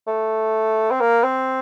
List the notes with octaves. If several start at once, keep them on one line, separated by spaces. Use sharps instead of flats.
A3
C4
A#3
C4